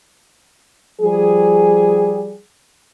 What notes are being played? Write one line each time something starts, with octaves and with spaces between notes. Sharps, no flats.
F3 G3 G#4